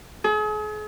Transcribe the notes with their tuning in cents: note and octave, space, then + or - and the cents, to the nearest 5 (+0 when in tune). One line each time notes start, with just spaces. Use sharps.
G#4 +40